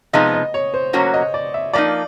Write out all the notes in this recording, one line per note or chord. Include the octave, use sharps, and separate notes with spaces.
C3 F3 G#3 B3 D#4 D#5
D#5
C#5
C5
A2 F#3 A#3 C#4 F#4 C#5
D#5
D5
E5
F3 A#3 D#4 D5